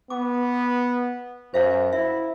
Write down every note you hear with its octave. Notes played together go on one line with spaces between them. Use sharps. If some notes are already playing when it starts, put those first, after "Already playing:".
B3 D6
F#2 C5 E5 F5
E4 E5